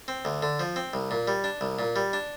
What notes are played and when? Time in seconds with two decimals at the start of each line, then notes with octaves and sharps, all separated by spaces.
0.08 C4
0.25 D2
0.43 D3
0.60 F3
0.76 C4
0.94 C2
1.11 A#2
1.28 G3
1.44 D4
1.61 C2
1.79 A#2
1.96 G3
2.13 D4